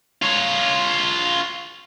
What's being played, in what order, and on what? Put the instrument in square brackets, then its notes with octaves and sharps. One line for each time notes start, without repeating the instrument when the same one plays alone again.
[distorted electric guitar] F4 C#5